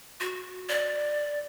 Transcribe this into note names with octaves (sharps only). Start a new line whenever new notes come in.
F#4
D5